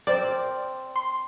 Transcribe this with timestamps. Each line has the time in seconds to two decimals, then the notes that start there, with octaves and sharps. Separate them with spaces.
0.07 C4 A#4 C5 D5
0.96 C6